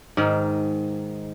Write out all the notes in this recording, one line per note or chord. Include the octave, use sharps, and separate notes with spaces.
G#2 D#3